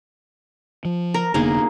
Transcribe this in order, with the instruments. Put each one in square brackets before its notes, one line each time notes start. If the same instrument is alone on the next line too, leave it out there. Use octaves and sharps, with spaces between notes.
[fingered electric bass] F3
[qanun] A#4
[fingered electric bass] F1 D3 B3 [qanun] A#3 D#4 G#4